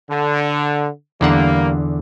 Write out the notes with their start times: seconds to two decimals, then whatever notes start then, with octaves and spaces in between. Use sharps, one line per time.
0.10 D3
1.21 E2 D3 G3 A#3 F#5